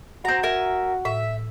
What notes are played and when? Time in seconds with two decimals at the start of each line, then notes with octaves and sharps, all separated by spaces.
0.25 C4 F#4 A#5
0.43 A#4 E5 G#5
1.05 A2 E5